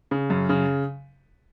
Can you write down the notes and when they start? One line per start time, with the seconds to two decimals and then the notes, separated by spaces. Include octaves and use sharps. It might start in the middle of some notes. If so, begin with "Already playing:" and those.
0.11 C#3
0.30 F#2
0.49 C#3